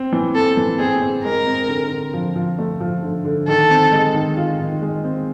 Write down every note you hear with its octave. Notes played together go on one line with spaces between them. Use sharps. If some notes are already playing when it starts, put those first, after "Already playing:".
Already playing: C4
E3
C4 A4
E3
C4 G#4
C4
G#3 A#4
C4
D3
D3
F3
F3
A3
F3
D3
D3
D#3 A4
C4
G#3
D#3
F4
D#3
G#3
C4